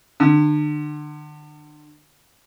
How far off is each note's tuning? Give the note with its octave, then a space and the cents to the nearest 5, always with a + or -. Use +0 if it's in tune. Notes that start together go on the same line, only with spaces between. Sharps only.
D3 +35